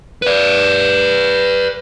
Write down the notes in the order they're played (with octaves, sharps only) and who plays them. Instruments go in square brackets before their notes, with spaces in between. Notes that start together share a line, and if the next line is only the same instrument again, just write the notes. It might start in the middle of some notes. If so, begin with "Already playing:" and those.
[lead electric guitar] B4 D5